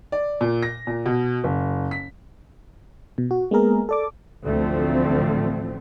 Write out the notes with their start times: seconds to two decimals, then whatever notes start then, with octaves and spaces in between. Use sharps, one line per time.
0.12 D5
0.41 A#2
0.63 A#6
0.87 A#2
1.06 B2
1.44 F#1
1.91 B6
3.18 B2
3.31 F#4
3.51 G#3 A#3 B3 G#4 A#4
3.89 A4 D5 D6
4.46 A1 D2 F3 A3 C4